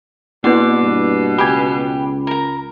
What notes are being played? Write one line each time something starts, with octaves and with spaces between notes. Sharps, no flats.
B2 A#3 B3 E4 B4 D5
G2
C#2 G4 G#5 B5
A#4 A#5